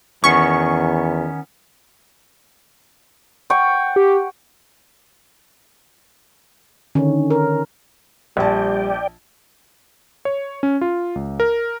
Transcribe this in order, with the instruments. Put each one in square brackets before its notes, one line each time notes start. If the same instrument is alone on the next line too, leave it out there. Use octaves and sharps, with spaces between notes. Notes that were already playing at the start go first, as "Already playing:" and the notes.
[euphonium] E2 [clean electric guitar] D#3 B3 C#4 [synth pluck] C#6
[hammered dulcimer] F#5 G5 C#6
[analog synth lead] G4
[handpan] D3 D#3 C#4
A#4
[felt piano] A#1 A5 [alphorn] G3 [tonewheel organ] D5 G5
[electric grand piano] C#5
C#4
F4
C#2
A#4